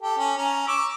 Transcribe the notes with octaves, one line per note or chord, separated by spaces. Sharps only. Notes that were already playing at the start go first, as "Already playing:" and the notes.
G4 A4
C#4
C#4 A#5
C#6 D6 E6